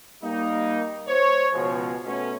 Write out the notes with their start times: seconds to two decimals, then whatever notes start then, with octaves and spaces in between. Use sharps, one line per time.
0.23 G3 A#3 D#4
1.08 C5 C#5
1.54 C#2 B2 F3 G#3
2.05 B2 A3 C#4